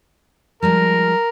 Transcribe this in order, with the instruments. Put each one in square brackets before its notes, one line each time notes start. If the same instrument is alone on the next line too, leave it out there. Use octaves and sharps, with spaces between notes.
[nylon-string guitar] F3 G3 G#3 [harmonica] A#4